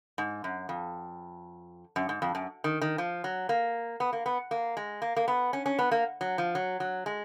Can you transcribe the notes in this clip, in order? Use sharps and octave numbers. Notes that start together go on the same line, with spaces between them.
G#2
F#2
F2
F#2
G#2
F2
F#2
D#3
D#3
F3
F#3
A#3
B3
A#3
B3
A#3
G#3
A#3
A#3
B3
C#4
C#4
B3
A#3
F#3
F3
F#3
F#3
G#3